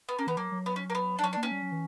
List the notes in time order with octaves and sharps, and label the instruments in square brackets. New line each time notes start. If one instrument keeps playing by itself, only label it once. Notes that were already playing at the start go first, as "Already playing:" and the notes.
[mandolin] B3
[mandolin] A#3 [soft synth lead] C#4
[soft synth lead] E3 [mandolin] B3
[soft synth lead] F#3 [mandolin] A#3
[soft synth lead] F#3
[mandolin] B3
C#4
A#3
B3
D4
[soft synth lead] F#3 [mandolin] C#4
[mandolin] D4
[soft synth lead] A#3
[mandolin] C#4
[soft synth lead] G3
F#3
E3